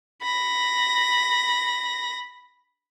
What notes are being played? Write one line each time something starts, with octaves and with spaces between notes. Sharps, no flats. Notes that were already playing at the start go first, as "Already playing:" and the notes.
B5 A#6